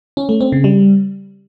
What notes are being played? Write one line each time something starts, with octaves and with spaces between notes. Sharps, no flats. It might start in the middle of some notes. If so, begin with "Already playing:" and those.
C#4
A3
C4
C#3
G3